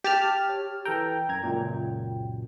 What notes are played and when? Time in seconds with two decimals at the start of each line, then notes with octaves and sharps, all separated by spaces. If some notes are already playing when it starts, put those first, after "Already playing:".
0.04 G4 A5 F6
0.49 C#5
0.85 E3 A4 G5 A#5
1.29 F#2 A#5 G#6
1.43 C#2 F#2 A#2